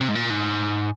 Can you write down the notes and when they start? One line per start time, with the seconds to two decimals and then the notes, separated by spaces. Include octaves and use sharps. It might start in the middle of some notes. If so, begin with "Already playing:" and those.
0.01 C3
0.08 G#2
0.15 A#2
0.30 G#2